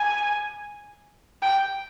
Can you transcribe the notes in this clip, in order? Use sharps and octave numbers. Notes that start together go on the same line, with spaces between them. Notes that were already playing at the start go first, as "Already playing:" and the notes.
Already playing: G#5
G5